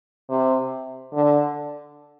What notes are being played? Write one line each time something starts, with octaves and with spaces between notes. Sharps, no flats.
C3
D3